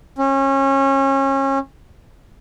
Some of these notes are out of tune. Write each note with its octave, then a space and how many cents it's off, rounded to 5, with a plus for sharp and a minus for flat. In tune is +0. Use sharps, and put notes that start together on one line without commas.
C#4 -30